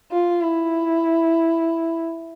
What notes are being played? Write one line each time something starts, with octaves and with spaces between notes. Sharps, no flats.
F4
E4